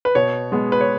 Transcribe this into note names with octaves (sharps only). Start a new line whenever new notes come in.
B4
B2 C#5
G#3 B3
B4
C#5